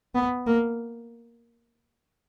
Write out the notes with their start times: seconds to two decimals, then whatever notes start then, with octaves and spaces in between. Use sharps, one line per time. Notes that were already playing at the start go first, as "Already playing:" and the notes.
0.15 B3
0.46 A#3